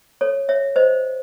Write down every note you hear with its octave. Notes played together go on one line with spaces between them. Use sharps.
A4 C#5
C#5 E5
C5 D#5